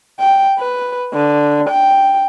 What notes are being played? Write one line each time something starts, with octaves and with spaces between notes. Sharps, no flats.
G5
B4
D3
G5